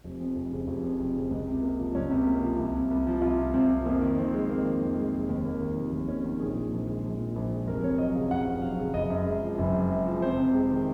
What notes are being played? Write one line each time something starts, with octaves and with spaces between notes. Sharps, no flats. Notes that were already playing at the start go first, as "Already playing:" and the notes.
F1
F2
F1
C#3
F1
F2
F1
C#3
C#2
C3
A#3
F3
C#2 C#4
C3
A#3
F3
C2
C3
C2
F3
C2 F4
C3
C2 C4
F3 C4
F2 A#3
D#3
F2 C4
G#3
F2 A#3
D#3
F2
G#3
F1
D#2
A#3
D#3
F1
D#2
A#3 C#4
D#3
A#1 G#4
A#2
A#1
G#3
A#1
A#2
A#1
G#3
F1 A#4
F2 C#5
F#3 D#5
C#3 F5
F1 F#5
F2
F#3 F5
C#3
F#1 D#5
F#2
G#3
F3
F#1
F#2
G#3
F3
F2 C5
C3
G#3
D#3